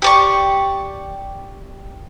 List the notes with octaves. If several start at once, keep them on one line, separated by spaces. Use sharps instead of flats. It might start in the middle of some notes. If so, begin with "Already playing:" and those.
G4 D5 C#6